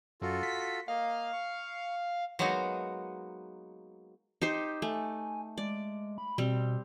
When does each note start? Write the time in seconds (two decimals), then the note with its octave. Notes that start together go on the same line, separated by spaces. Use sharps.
0.22 F#2 F4 F#4 A4
0.43 B6
0.88 A#3 D#5 F5
1.33 C#6
2.39 F#3 G#3 A#3 B3 D#4 F#4
4.41 D#4 G4 C5
4.82 A3 G#5
5.58 G#3 D5
6.18 B5
6.38 B2 G3 C4